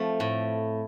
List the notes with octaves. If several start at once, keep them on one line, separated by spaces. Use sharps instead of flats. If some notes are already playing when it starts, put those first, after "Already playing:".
Already playing: F3 A3 C4
A2